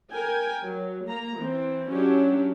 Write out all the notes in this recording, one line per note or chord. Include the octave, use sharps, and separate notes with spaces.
A#4 G5 G#5
F#3
A#3 A#5
E3 C4
F#3 C#4 D4 E4 G4